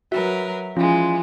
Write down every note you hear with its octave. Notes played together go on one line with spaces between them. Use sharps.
F#3 F#4 A#4 B4 E5
E3 F3 G#3 C#4 F4